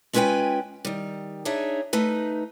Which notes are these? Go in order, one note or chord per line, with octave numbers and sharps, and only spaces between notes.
G#3 C#4 F4 B4 G5 G#5
D#3 G3
D4 D#4 G#4 C#5 E5
A3 D#4 B4